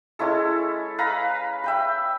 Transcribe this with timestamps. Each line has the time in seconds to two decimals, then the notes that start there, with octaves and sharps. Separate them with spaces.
0.19 G#3 C#4 E4 A4
0.98 B4 F5 A#5 B5
1.64 E5 G5 B5